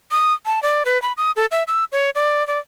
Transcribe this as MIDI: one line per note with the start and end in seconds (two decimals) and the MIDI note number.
0.11 0.34 87
0.46 0.62 81
0.63 0.83 74
0.85 1.00 71
1.02 1.13 83
1.17 1.31 87
1.36 1.46 69
1.51 1.63 76
1.68 1.84 88
1.92 2.10 73
2.15 2.46 74
2.47 2.59 74